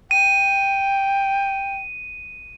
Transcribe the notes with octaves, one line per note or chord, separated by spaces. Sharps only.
G5 D#7